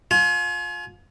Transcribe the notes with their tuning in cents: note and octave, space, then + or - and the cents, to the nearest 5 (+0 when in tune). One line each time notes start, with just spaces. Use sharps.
F4 +25 G#5 +40